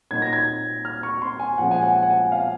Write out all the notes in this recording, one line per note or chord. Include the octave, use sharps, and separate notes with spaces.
A#2 F#3 A#3 D#4 G#6
A#6
G#6
F6
C#6
C6
G#5
A#2 F3 G#3 C#4 F#5
G#5
F#5
G#5
F#5
G#5
F5